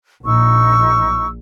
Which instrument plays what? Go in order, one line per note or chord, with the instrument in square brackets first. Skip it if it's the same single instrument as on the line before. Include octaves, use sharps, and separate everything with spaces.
[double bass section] A#1 [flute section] D#4 C#6 E6